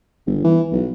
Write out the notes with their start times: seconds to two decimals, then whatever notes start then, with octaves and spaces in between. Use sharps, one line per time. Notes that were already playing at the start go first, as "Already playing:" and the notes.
0.27 G1
0.44 E3
0.72 B1